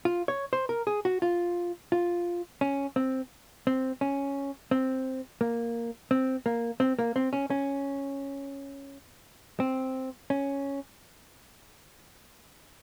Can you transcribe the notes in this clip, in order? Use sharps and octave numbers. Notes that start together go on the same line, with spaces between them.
F4
C#5
C5
A#4
G#4
F#4
F4
F4
C#4
C4
C4
C#4
C4
A#3
C4
A#3
C4
A#3
C4
C#4
C#4
C4
C#4